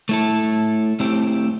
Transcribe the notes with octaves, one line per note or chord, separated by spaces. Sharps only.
A3 E4 A4
A3 C4 E4 G4